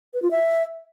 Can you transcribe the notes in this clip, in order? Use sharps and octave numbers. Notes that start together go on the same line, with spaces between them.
B4
F4
E5